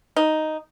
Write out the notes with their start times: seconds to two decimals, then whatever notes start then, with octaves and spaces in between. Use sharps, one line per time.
0.16 D#4